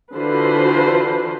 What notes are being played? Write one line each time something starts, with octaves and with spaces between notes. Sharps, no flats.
D3 E3 F4 F#4 B4 C5